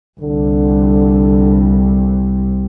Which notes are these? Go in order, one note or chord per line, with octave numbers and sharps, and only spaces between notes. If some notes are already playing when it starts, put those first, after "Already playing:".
C2 D3